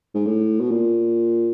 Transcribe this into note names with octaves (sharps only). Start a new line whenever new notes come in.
G#2
A2
B2
A#2